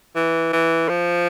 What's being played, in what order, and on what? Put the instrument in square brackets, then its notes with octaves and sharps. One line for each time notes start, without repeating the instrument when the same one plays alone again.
[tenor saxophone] E3
E3
F3